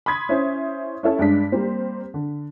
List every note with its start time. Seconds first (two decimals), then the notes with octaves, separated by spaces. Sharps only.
0.06 B5 C6 D#6 G#6 B6
0.29 C#4 E4 C5
1.03 C#4 E4 A4 C#5
1.19 G2 G#3 D4 B6
1.52 G3 A#3 C4
2.14 D3